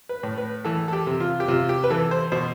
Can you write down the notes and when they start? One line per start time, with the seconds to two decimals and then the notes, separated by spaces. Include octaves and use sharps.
0.09 B4
0.23 A2
0.38 B4
0.64 E3 A4
0.88 A4
0.93 G4
1.07 C3
1.20 F4
1.40 G4
1.48 C3 F4
1.69 G4
1.84 B4
1.90 E3 A4
2.11 C5
2.32 B2 C5